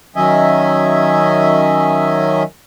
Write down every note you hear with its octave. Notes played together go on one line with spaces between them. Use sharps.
D#3 F#3 C#4 D#5 E5 G#5